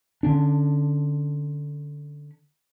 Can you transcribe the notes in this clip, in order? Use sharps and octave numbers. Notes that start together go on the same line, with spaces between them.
D3 C#4 D4